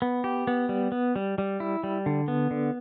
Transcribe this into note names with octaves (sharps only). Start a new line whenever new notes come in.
B3
G4
B3
G3
B3
G3
G3
E4
G3
D3
B3
D3